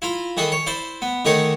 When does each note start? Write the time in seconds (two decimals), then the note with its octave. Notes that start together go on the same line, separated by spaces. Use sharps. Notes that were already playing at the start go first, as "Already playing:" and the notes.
0.02 E4 F4 A#5
0.37 D#3 E3 G#4 A4
0.52 C#5
0.66 E4 C5 D5
1.02 B3
1.25 D3 D#3 A3 D#4 G#4 C#5